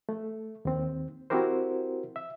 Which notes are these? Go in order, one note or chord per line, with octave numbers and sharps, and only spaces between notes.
A3
D#2 C4
C4 E4 F#4 G4 A#4 C5
E5